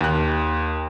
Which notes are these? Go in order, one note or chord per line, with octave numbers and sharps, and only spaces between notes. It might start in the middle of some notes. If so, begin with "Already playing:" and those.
D#2 F#6